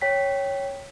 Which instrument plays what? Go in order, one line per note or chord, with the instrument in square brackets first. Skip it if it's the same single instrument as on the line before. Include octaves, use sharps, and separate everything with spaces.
[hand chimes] C#5 G5 B6